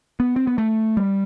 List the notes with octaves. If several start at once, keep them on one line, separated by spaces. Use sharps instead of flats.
B3
C4
B3
A3
G3